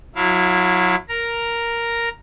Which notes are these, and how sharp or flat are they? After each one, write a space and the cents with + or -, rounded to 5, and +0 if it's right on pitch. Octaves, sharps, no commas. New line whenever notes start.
F#3 -25 E4 +0 F5 +0
A#4 +0 A#5 +0